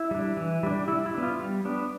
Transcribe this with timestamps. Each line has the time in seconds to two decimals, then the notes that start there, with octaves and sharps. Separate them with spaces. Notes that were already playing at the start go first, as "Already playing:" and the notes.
Already playing: E4
0.11 G3 D4
0.37 E3
0.63 G3 D4
0.88 G3 E4
1.06 E4
1.14 B3 D4
1.23 F4
1.39 G3
1.65 B3 D4